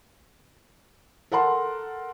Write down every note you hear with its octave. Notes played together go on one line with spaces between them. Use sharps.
A4 A#4 F#5 A5 C6